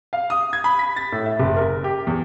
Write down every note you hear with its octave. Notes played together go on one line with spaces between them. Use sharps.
F5
D#6
G#6
B5
B6
A6
A2
E5
F#1
A#4
G4
E2